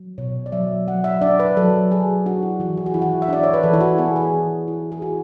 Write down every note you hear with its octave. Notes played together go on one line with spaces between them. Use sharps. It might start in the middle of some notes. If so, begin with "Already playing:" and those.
Already playing: F#3
B2 C#5
D5
F#3 E5
F#3 F#5
E5
D4 D5
B4
F#3 A4
F#3 G#4
D4 F#4
E4
E3 F#4
G#4
F#4
E3 E4
F#4
E5
D4 D5
C#5
B4
E3 A4
E4
F#4
B3 G#4
G#4
E3
E4
G#4
E4 F#4